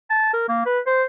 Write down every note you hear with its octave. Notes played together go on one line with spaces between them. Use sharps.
A5
A#4
A#3
B4
C5